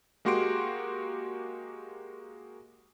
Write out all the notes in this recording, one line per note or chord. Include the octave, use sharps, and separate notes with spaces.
G#3 A#3 F#4 G4 C6 D7